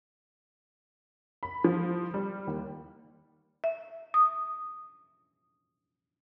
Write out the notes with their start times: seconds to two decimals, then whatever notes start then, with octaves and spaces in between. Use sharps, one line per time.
1.43 B5
1.64 F3
2.14 G3
2.47 D#2
3.64 E5
4.14 D#6